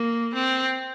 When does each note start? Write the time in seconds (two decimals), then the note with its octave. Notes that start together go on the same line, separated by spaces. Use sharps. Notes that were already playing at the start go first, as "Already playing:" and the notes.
Already playing: A#3
0.34 C4